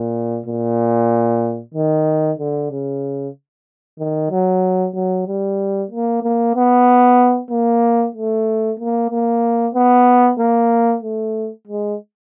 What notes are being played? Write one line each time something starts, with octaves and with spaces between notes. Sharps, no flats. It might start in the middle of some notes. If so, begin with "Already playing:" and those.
Already playing: A#2
A#2
D#3
D3
C#3
D#3
F#3
F#3
G3
A#3
A#3
B3
A#3
A3
A#3
A#3
B3
A#3
A3
G#3